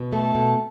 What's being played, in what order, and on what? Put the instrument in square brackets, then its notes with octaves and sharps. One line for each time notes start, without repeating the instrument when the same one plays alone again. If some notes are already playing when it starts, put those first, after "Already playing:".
Already playing: [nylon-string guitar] B2
[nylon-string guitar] A3 [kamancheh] A4
[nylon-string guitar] B2